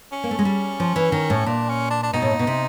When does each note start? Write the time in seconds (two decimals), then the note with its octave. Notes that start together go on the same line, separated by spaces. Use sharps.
0.12 C#4
0.24 A#3
0.31 A3
0.39 G#3
0.45 G3
0.80 F3
0.96 E3
1.12 D#3
1.30 A2
1.46 A#2 D4
1.69 C#4
1.91 D4
2.03 D4
2.13 B2 D#4
2.22 A2
2.31 A#2
2.39 B2
2.47 C3